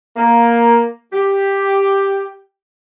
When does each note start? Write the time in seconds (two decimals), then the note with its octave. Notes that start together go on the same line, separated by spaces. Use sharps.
0.16 A#3
1.13 G4